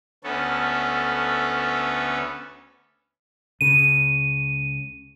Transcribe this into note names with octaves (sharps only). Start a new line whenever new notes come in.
D2 B3 C#4 A4
C#2 C#3 D#7